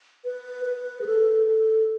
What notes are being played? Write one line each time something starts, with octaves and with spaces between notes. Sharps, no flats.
B4
B4
G#4
A4
A4